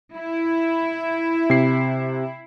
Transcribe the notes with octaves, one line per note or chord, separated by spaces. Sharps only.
E4
C3 C7